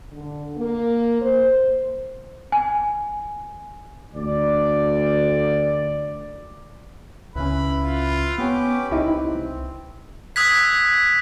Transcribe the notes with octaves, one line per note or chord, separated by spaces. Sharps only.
D3
A#3
C5
G#5
D2 D5
C#2 C#3 C#4 E4 B4 B5
F4
B3 C#4 G4 B4 D6
C2 C4 D#4 E4 G4
D#6 E6 F#6 G#6 B6